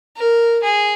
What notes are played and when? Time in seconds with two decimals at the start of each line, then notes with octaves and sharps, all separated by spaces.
0.17 A#4
0.63 G#4